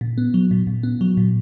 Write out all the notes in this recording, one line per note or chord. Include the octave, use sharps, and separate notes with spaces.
A#2
B3
F#3
A#2
A#2
B3
F#3
A#2